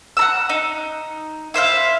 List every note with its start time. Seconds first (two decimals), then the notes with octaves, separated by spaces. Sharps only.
0.17 F#5 A#5 E6
0.49 D#4
1.54 E4 C5 E5 F5